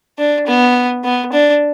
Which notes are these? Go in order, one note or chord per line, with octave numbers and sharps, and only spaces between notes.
D4
B3
B3
D4